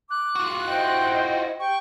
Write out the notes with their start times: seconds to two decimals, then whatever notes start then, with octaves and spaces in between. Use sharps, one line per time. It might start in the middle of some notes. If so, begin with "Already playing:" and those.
0.11 D6 F#6
0.36 F4 F#4
0.67 E4 C5 D#5 G5
1.60 G4 G5 C#6